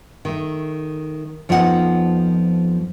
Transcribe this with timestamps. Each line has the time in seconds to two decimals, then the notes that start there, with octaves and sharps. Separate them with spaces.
0.25 D#3 A3
1.49 F2 F3 B3 D#4 A4 F#5